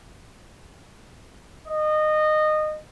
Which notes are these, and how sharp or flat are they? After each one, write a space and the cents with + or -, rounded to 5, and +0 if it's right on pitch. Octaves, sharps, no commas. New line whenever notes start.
D#5 -20